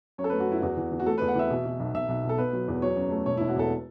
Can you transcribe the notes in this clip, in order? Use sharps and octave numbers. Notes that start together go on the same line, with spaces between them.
F#2 C#5
A4
B4
A3
F#4
F#2 E4
E4
E2 F#4
E3
E3
F#4
A3 A4
B4
E2
F#5
E3 E5
B2
B2
B1
B1 E5
B1
B2
A4
B3 B4
F#3
E2
F#3 C#5
F#2
A3
E1 C#5
E4
E1
F#4
E2 A4